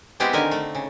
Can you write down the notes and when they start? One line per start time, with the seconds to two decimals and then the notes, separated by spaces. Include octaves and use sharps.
0.20 G#3 B3 C4 E4 G4 G#4
0.33 D3 D#3 D#4 A#4 G#5
0.51 A3
0.75 C#3